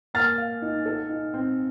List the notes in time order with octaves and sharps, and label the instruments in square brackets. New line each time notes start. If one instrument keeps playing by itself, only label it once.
[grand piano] A#3 [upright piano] F6 A6
[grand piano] F5
D#4
A4
D#4
C4